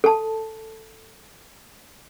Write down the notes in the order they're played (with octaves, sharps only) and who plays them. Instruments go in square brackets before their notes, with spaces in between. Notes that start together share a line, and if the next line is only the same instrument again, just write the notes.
[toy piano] A4 A5